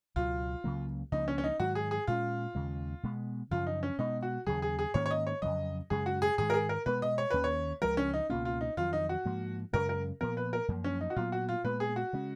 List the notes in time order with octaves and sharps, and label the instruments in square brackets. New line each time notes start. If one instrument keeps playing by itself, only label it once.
[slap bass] C#2 B2 F#3 [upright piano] F4
[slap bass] C#2 C#3 F#3 A#3
[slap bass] C#2 C#3 F3 A#3 [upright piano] D#4
[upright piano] C#4
C#4
D#4
[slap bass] G#2 D#3 F#3 [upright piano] F#4
[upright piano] G#4
G#4
[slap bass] A#2 G#3 C#4 [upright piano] F4
[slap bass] D#2 C#3 G#3
B2 G#3 B3
[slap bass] F#2 C#3 F3 [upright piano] F4
[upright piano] D#4
C#4
[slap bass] B2 G#3 B3 [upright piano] D#4
[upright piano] F#4
[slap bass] D#2 C#3 F#3 [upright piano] G#4
[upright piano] G#4
G#4
[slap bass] G#2 D#3 A#3 C#4 [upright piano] C#5
[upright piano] C#5
D#5
C#5
[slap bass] F2 C#3 F#3 [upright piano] D#5
[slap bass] F#2 C#3 G#3 [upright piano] G#4
[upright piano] F#4
G#4
[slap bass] G#2 D#3 G#3 [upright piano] G#4
[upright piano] A#4
G#4
A#4
[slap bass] B2 G#3 B3 [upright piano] B4
[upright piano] D#5
C#5
[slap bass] D#2 D#3 A#3 C#4 [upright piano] B4
[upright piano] C#5
[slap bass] C#2 C#3 F3 G#3 [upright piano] A#4
[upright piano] C#4
D#4
[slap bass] C#2 B2 A#3 C#4 [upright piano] F4
[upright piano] F4
D#4
[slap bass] F2 D#3 F#3 [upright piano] F4
[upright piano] D#4
F#4
[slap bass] G#2 F3 A#3
[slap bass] F#2 C#3 G#3 [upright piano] A#4
[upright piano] A#4
[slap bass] A#2 F3 B3 [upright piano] A#4
[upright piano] B4
A#4
[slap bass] F#2 F3 A#3
[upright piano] C#4
D#4
F#4
[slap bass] A#2 F#3 B3 [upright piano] F4
[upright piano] F#4
F4
[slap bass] A#2 G#3 B3 [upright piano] B4
[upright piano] G#4
F#4
[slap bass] C#3 G#3 C#4